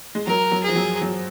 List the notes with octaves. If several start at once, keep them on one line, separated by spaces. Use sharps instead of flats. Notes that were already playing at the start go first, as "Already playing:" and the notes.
G#3
F#3 A#4
F#3
F3 G#4
F#3
F#3